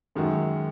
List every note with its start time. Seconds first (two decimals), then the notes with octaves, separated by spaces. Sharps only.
0.15 F#2 D#3 G#3 F#4